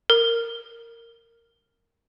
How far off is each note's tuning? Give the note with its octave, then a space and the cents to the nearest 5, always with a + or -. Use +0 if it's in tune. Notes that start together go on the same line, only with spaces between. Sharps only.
A#4 -10